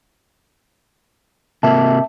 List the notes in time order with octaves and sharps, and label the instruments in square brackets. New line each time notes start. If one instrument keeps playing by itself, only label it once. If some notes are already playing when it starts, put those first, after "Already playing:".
[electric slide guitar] C3 A#3 [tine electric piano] E5 A5